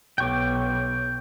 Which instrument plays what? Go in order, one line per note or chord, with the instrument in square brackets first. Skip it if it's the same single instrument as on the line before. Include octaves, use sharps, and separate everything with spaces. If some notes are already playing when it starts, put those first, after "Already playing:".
[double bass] B1 [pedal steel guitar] G5 C#6 D6